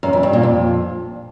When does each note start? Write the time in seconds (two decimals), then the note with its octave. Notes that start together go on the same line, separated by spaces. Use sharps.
0.03 F#2
0.13 F2
0.23 G2
0.33 A#2
0.43 F2